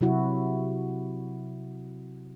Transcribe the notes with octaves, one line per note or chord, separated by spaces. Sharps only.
C3 F#3 E4 F#4